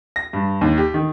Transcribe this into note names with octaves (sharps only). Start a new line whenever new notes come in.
A#6
G2
D#2
G4
D#3